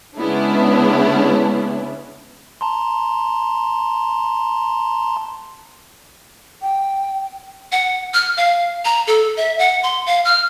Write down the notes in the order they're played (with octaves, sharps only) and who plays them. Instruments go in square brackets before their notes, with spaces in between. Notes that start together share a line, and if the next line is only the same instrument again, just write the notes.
[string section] C#3 G#3 B3 C#4 D4 E4
[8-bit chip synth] A5 A#5 C6
[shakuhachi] G5
[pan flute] F#5
F6
F5
A#5
A4
E5
F#5
C6
F5
F6